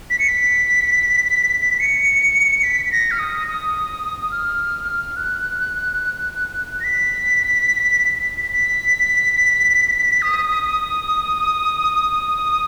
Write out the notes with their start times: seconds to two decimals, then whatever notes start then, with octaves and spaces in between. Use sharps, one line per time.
0.10 B6
0.19 C#7
0.28 B6
1.80 C#7
2.63 B6
2.86 B6
2.92 A#6
3.11 F6
3.19 D#6
3.48 D#6
4.31 F6
5.16 F#6
6.80 A#6
6.84 B6
8.53 B6
10.22 D#6